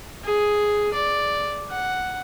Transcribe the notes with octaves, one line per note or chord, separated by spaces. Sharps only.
G#4
D5
F#5